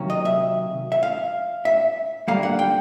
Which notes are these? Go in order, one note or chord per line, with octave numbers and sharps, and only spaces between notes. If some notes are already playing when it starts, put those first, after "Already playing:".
Already playing: C3 D#3 F#3 A#3 C#4
D#5
E5
E5
F5
E5
D3 G3 A#3 F5
F#5
G5